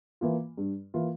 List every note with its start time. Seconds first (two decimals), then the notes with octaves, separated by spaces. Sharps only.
0.21 E3 A#3 F4
0.57 G2
0.94 E3 A#3 F4